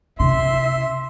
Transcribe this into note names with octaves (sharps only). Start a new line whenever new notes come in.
C3 C#4 E5 C6